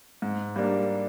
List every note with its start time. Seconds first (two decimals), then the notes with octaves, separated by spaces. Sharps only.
0.22 G#2
0.56 G3 A#3 D4